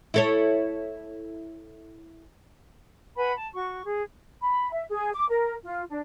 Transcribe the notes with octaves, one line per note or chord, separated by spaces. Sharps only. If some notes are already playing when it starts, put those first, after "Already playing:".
E4 A4 C#5
B4 F#5 G#5 B5
A5
F#4 C#6
G#4
B5
E5
G#4
D6
A#4
F4
D4